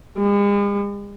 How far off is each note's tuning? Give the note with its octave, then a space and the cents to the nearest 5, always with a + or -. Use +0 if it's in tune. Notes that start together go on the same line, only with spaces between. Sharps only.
G#3 -45